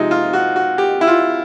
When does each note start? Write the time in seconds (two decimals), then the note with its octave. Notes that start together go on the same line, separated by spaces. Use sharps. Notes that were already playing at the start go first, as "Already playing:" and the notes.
Already playing: C3 F3 G#3 D#4
0.11 F4
0.33 F#4
0.56 F#4
0.78 G4
1.01 E4
1.07 F4